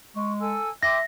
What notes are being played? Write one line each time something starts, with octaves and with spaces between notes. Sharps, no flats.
G#3 C#6
A4 G#5 E6
E5 G5 C6 D6 A#6